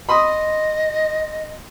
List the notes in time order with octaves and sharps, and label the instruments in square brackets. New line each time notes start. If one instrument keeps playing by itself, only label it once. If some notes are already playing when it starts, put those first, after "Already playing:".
[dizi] D#5 [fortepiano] B5 C6 D#6